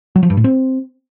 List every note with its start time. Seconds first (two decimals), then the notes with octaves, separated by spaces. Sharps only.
0.16 F#3
0.23 F3
0.30 G2
0.37 A2
0.44 C4